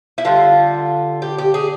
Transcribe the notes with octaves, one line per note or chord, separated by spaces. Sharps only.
E4
D3 G3 F4
G4
G4
G#4